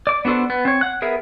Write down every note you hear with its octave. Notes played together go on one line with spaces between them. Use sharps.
D5 D6
B3 D4 F#4 A4 C5
B3
C4 C#5
F#5 F#6
B3 G#4 A#4 E5